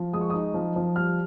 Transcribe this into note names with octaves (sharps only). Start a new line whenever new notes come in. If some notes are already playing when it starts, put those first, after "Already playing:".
Already playing: F3
G#3 D#6
C#6
D#4 D#6
F3
F3
G3 F6